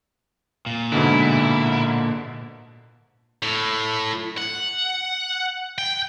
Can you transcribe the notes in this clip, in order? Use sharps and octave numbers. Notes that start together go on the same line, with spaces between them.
A#2
G#2 B2 D3 E4
A2
F#5
G5